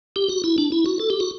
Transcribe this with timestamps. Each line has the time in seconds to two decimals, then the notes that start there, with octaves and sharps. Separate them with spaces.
0.16 G4
0.29 F#4
0.44 E4
0.58 D4
0.72 E4
0.86 F#4
1.00 A4
1.10 G4
1.20 F#4